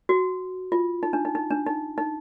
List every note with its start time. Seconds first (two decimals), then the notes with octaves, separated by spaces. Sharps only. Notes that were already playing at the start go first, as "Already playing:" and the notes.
0.09 F#4
0.72 F4
1.03 D#4
1.13 D4
1.25 D#4
1.35 D#4
1.50 D4
1.66 D#4
1.98 D#4